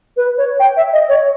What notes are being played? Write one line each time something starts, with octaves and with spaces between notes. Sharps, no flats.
B4
C#5
G5
E5
D#5
C#5